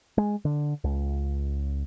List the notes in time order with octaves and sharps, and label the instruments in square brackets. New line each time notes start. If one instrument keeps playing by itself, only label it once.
[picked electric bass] G#3
D3
C#2